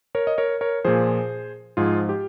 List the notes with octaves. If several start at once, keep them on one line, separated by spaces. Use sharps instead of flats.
A#4 C#5
D#5
A#4 C#5
A#4 C#5
A#2 F3 G#4 C5
G#2 F3 F4 G#4
G4